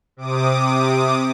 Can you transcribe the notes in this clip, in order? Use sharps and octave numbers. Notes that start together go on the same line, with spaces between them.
C3 D6 D#6